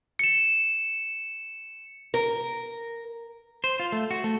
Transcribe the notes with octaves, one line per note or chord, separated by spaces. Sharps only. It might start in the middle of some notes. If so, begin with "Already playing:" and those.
C#7 E7
A#4
C5
F4
A3
F#4
A3